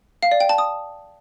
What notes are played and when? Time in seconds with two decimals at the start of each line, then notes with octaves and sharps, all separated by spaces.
0.23 F5
0.31 D5
0.40 G5
0.49 A5
0.58 D#6